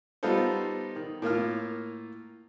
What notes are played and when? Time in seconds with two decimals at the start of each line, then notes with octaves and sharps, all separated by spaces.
0.23 G3 B3 D#4 F4 A4 C5
0.96 D#3
1.22 A2 A#3 F4 F6